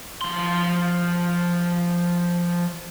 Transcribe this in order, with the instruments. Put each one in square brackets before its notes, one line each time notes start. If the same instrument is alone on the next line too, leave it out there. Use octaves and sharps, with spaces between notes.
[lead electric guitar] F3 C6